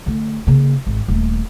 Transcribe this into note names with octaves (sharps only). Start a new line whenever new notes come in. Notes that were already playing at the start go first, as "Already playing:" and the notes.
D3 A3
C#3 A#3
G#1
D#1 A3